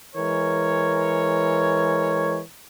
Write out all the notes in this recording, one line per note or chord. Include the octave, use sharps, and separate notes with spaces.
E3 G#3 A#4 C#5